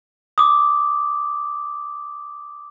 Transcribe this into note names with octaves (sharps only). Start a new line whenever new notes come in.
D6 D#6